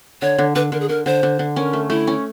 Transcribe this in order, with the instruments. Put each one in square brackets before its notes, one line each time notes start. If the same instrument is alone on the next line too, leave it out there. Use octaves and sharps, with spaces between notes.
[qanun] D3 [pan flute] C#5
[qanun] D3
[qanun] D3 [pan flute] B4
[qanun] D3 [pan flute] A#4
[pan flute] G#4
[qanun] D3 [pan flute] A#4
[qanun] D3 [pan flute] C5
[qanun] D3
D3
[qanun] C#4 [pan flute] A#4
[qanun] A3
[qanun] A3 [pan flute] E4
[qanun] C#4